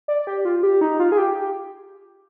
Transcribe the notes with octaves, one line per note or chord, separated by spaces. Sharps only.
D5
G4
F4
G4
D#4
F4
G#4
G4